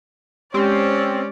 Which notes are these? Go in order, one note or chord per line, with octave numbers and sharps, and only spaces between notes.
G#3 C4 C#4 G4 D5